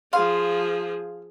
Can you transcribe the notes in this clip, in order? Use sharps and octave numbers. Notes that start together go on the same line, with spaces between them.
F3 G#4 F5 C6